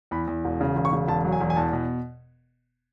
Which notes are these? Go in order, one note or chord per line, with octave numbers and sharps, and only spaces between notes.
E2 B5
E2
E1
C#3
E1
C#6
C#3
E1 A5
F#3
G#5
E1
G#5
E2 A5
B2